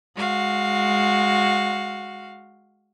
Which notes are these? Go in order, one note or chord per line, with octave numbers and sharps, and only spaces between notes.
G#3 F#4 F5